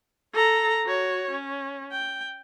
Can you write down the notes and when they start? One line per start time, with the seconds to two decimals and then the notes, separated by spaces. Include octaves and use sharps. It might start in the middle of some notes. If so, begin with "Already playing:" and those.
0.33 A4 A#5
0.85 F#4 C#5
1.31 C#4
1.92 G5